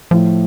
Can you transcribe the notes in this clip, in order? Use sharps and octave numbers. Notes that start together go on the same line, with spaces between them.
A2 F3